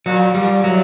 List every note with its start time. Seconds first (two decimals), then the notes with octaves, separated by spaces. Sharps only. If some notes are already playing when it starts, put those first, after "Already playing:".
0.06 A#2 F#3
0.35 A#2 G3
0.64 A2 F#3